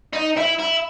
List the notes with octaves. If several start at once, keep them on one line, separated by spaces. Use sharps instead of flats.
D#4
E4
E4